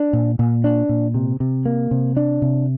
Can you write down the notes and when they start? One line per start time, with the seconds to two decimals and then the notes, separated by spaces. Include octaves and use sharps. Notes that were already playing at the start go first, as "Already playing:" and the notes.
Already playing: D4
0.13 A#2
0.39 A#2
0.64 D4
0.89 A#2
1.14 C3
1.40 C3
1.66 A#3
1.91 C3
2.17 D4
2.42 C3